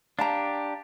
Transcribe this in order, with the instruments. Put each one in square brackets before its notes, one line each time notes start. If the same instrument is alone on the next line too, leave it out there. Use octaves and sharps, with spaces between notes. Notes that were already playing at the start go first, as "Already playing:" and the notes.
[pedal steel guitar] D4 G4 [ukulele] F5 A5 A#5